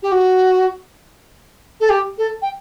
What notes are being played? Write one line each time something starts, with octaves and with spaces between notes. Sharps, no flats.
G4
F#4
A4
G4
A4
G5